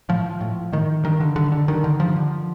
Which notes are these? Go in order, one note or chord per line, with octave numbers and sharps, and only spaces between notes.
A2 F3
A2
A2 D#3
G2 D#3
D3
G2 D3
D3
G2 D#3
D3
G2 F3
D3